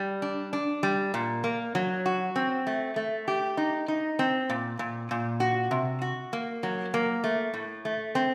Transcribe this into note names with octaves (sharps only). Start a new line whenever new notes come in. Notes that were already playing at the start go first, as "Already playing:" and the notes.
Already playing: G3
D4
D4
G3
A#2
A#3
F#3
F#4
C4
A3
A3
G4
D#4
D#4
C4
A#2
A#2
A#2
F#4
C3
F#4
A#3
F#3
A#3
A3
A2
A3
C4